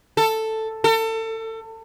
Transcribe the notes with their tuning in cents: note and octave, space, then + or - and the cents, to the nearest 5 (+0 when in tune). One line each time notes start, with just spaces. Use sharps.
A4 +5
A4 +30